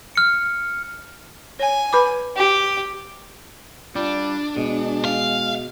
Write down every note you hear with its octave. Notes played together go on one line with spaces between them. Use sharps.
F6 C#7
C#5 G#5
B4 B5 D6
G4
G3 D4 F4
B2 G#3
F5